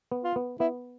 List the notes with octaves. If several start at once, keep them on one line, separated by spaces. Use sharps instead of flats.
B3
F4
B3
B3 E4